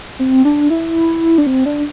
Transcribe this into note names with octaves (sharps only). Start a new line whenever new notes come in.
C4
D4
E4
D4
C4
D4